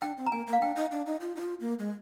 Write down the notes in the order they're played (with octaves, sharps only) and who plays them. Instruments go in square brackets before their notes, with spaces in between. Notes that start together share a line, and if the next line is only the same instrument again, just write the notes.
[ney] D4 [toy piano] G5
[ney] C4
[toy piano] A#5
[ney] A#3 [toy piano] G#5
[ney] A#3
[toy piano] F5
[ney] D4 [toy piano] G5
[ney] D#4
D4
D#4
F4
D#4
F4
A#3
G#3